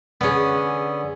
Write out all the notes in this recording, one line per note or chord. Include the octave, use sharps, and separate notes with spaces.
D3 B3 C#4 G#4